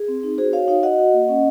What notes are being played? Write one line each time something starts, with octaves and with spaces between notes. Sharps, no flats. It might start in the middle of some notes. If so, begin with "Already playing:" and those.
Already playing: G#4
C4
D#4
F#4 G#4 C5
F#4 C#5 F5
D#4 C#5 F5
F#4 D#5 F#5
F#4
A#3
C#4